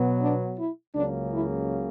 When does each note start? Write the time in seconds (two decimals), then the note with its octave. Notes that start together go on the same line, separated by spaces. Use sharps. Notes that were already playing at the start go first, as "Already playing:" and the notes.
Already playing: B2 F#3 B3
0.22 D4
0.58 E4
0.95 C#2 C#3 F#3 A#3 D4
1.32 E4